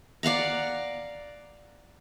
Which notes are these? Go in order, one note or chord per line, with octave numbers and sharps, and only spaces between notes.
D5 F5 F#5 A#5